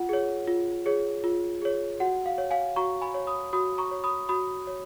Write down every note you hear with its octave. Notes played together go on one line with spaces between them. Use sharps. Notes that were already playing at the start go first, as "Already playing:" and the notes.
Already playing: F4 F#5
G#4 C#5
F4
G#4 C#5
F4
G#4 C#5
F#4 F#5
F5
C#5
F5 G#5
F#4 A#5 C#6
G#5 B5
C#5
B5 D#6
F#4 B5 D#6
A#5 C#6
C#5
B5 D#6
F#4 B5 D#6
C#5